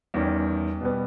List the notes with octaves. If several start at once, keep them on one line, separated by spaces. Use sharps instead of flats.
E2 D#3 G3 C#4 G4
B2 G3 B3